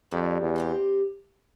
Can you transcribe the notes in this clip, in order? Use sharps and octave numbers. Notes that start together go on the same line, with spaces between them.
F2 G3
E2
C4 E4 G4